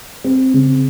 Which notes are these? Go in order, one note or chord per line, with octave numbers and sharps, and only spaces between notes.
C4
C#3